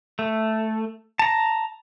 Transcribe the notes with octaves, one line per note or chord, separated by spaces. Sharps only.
A3
A5 A#5